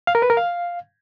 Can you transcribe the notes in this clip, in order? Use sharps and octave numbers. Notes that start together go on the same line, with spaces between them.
F5
A#4
B4
A#4
F5